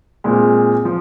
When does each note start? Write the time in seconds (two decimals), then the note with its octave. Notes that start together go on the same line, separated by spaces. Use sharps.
0.24 A#2 G#3 C4 F4
0.85 F3